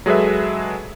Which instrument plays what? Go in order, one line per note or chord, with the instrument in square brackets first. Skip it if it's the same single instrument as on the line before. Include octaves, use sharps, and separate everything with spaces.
[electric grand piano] F#3 G#3 G#4 A4 B4 E5